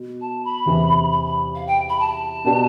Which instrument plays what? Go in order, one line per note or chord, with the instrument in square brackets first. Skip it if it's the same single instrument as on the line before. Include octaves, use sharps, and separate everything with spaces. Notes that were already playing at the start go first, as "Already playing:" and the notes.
Already playing: [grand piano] B2
[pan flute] A5
B5
[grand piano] E2 C3 E3
[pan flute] B5
B5
F5
G5
B5
A5
[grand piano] B2 B3 D4 G4 D5